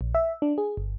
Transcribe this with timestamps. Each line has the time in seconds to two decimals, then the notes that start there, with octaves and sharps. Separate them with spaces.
0.01 A#1
0.15 E5
0.42 D4
0.58 G#4
0.77 G1